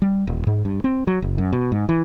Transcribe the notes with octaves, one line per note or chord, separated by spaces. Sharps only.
G3
D#1
G#2
G2
C4
F#3
F#1
F#2
B2
G#2
E3